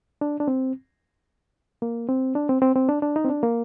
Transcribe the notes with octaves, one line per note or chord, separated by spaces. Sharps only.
D4
D4
C4
A#3
C4
D4
C4
C4
C4
D4
D4
D#4
C4
D4
A#3